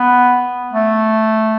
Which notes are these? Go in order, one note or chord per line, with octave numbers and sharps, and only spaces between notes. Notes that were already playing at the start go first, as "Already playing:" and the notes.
Already playing: B3
A3